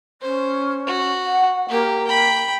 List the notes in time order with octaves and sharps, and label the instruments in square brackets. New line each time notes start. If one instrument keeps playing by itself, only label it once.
[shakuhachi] C#4 [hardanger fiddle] C5
[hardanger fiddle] F#4
[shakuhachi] F#5
[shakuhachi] A#3 [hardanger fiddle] G4
[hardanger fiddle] G5 B5